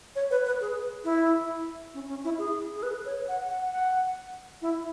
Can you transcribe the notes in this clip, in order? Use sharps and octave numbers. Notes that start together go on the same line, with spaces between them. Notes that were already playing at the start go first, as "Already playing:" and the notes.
C#5
B4
B4
G#4
E4
C#4
C#4
E4
G#4
G#4
B4
C#5
F#5
F#5
F#5
E4